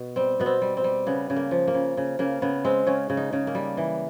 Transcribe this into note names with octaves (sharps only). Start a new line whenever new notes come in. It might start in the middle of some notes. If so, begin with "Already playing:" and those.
Already playing: B2
G3 C4
B2 B3
C4
G3
C4
G3
C#3 B3
C#3
A#3
F3
A#3
C#3
C#3
C#3 A#3
C#3 B3
G#3 C4
C#3 C#4
C#3
D#4
C#3
A#3
G3
E3